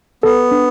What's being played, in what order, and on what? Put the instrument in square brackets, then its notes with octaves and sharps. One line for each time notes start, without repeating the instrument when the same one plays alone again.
[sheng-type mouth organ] B3 [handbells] A4
[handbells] D4